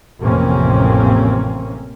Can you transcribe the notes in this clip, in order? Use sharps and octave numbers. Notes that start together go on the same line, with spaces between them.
A1 F2 C3 A#3 C4 C#4